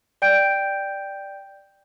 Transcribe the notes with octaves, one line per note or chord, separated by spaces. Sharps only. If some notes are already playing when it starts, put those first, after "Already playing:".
D5 G5 G6 D7